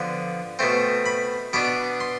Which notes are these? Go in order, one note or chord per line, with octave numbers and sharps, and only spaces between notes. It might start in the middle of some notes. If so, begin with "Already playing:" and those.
Already playing: D3 F3 B3
B2 A3 C4
B5
B2 B3 D4 D6
C6